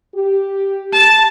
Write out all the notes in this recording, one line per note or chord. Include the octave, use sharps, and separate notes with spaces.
G4
A5